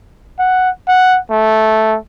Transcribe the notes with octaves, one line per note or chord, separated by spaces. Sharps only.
F#5
F#5
A3